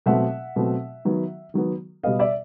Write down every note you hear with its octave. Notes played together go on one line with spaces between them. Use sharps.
B2 F#3 A3 C4 E5 F#5
B2 F#3 A3 C4
D#3 F#3 B3
D#3 F#3 B3
B2 G3 B3 D#5 F5
D5 E5